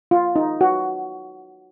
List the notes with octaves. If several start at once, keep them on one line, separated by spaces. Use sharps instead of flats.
F4
D#4
F#4